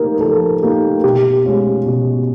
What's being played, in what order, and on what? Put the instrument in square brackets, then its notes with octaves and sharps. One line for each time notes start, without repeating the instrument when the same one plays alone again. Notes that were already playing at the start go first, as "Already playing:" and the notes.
Already playing: [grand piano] F3 A#3 D#4 G4 [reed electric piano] A#4
[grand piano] F3 [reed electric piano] A4
[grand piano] A#3 D#4 G4
[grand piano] B2 [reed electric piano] G4
[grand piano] G#3 C#4 F4
B2